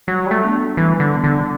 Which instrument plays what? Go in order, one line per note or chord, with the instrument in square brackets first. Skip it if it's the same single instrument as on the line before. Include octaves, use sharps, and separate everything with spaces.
[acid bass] F#3 [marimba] G3
[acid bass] G3
A3
[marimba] B3 D4
[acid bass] E3 [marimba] G3
[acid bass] D3
[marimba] B3 D4
[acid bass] D3